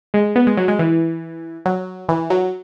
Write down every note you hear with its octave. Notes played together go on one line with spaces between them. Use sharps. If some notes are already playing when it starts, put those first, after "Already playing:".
G#3
B3
G#3
F#3
G#3
E3
F#3
E3
F#3